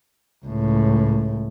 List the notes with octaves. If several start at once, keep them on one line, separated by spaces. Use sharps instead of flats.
C#2 A2